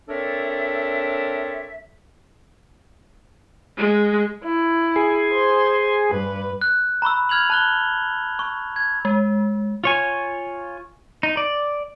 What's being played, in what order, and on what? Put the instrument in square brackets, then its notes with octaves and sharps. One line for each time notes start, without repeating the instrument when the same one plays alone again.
[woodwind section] C4 D4 A4 A#4 C#5 E5
[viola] G#3
[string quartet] E4
[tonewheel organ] G#4
[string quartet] C5
G2 B4
[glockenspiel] F#6
A#5 B5 C#6 E6
F6 G#6 F7 F#7
A5 F#6 G7
C#6
G#6
[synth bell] G#3
[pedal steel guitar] F4 C#5 G#5
D#4
D5